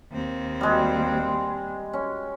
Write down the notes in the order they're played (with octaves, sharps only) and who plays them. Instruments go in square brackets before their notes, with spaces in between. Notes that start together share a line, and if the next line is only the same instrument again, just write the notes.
[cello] D#2 C4
[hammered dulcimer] G3 G#3
C#4